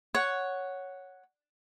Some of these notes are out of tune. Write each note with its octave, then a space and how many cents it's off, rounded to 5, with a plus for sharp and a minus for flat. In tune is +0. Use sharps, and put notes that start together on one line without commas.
C#5 +0 F#5 +0